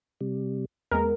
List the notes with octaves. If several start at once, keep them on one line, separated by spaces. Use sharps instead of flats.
C3 G3
E2 G#3 A#3 B3 A#4